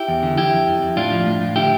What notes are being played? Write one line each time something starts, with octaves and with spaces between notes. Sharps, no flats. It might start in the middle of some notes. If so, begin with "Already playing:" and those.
Already playing: E4 G4
E2
D3
F2 E4 G4
F2
F2
F2
A2 D4 F4
F3
A2
A2
D3 E4 G4